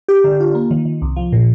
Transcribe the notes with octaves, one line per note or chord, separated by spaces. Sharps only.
G4
D3
F4
A#3
D#3
D#3
C2
F3
A#2